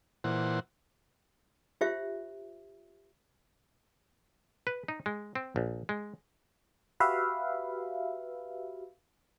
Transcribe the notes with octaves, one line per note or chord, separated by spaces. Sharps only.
A#2 E3 C5 F#5
F4 G4 C5 E5
B4
D#4
G#3
C4
A#1
G#3
F#4 G4 B4 E5 F5